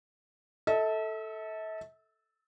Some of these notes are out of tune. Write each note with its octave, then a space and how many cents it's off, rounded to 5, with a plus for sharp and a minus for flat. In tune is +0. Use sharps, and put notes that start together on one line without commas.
A4 +0 E5 -40